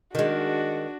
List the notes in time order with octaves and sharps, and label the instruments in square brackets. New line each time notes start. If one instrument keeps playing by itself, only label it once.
[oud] D#3 G#3 [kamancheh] D4 F#4